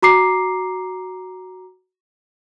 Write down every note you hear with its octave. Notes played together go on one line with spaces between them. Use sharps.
F#4 A#5 D6 C7